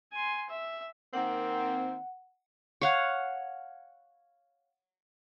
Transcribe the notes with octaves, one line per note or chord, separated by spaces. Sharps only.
G#5 C6
E5
D#3 A#3 C4 F#5
C#5 F5 F#5